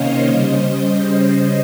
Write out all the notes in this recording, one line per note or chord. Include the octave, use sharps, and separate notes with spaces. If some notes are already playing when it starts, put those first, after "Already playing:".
Already playing: C3 D#3 A#3 C#4 C5 C#5 D#5 F5
C#3 G3 C#4